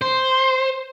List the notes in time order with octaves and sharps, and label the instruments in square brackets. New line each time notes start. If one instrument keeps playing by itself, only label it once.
[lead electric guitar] C5